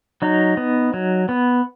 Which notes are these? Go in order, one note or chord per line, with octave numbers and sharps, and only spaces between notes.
F#3 D#4
B3
F#3
B3